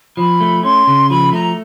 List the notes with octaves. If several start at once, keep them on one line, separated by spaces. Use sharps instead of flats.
F3 B5
A3
C#4 C6
C#3
F3 B5
A3 A#5